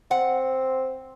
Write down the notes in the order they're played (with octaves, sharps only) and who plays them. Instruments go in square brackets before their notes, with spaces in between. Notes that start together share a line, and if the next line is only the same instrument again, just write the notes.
[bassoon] C4 [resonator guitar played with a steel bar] F#5